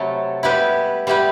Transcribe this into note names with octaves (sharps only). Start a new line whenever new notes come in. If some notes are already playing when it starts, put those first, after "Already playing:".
Already playing: C3 F#3 A3 E4 A4
G3 B3 E4 G4 B4
G3 B3 E4 G4 B4